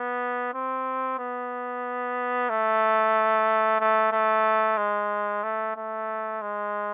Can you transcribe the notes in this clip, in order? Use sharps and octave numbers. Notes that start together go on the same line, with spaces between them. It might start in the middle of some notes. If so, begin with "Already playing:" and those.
Already playing: B3
C4
B3
A3
A3
A3
G#3
A3
A3
G#3